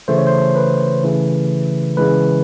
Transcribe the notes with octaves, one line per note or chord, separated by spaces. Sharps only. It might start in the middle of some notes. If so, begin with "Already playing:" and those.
C#3 E3 A3 C5
C#5
C5
B4
C#3 E3 A3
C#3 E3 G#3 B4